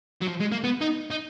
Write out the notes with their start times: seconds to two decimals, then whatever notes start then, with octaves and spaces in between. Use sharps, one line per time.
0.22 F#3
0.29 F3
0.40 G#3
0.52 A#3
0.64 B3
0.81 D#4
1.10 D#4